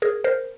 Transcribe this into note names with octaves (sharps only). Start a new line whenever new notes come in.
G#4 A#4
A#4 C5